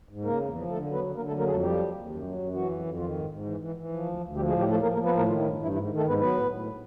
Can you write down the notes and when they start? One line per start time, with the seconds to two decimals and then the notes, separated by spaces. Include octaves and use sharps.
0.09 G#2
0.25 C#3 A#3 A#4
0.39 E2
0.55 F3
0.70 D3 A3 A4
0.85 F#3
0.93 B3 B4
1.01 D3
1.16 D3 A#3 A#4
1.27 A3 A4
1.32 F#3
1.39 A#3 A#4
1.46 F2 A3 G#4 A4
1.62 F3 G3 G4
1.77 D#2
1.93 D#2
2.08 F#2
2.23 F#3
2.38 F#2
2.53 E3 F#3 F#4
2.69 F2
2.84 F2
2.99 D#3 F3 F4
3.14 G#2
3.29 G#2
3.45 E3
3.60 E3
3.76 E3
3.91 F3
4.06 D2
4.21 D2
4.36 F3 G3 G4
4.48 G#3 G#4
4.51 A2
4.59 G3 G4
4.67 F3 A3 A4
4.82 F3 A#3 A#4
4.93 A#3 A#4
4.98 F3
5.05 B3 B4
5.13 A2 A#3 A#4
5.28 D#3 F3 F4
5.39 E3 E4
5.43 G2
5.58 G2 E3 E4
5.74 G#2 E3 E4
5.89 D#3
5.97 A3 A4
6.04 G#2 B3 B4
6.19 F#3 B3 B4
6.35 A2
6.51 A2